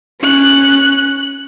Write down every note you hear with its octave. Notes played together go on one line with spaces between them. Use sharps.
C#4 F#6